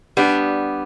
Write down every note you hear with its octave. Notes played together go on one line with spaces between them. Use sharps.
G3 B3 D4